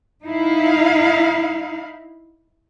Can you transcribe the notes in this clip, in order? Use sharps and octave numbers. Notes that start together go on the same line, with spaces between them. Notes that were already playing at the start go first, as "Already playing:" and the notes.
D#4 E4 F5